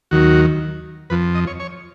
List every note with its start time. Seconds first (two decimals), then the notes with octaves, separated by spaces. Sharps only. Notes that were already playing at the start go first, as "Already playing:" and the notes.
0.11 D#2 D#3 F#3 F#4
1.10 F2 F3 B4
1.35 D#5
1.47 C#5
1.60 C#5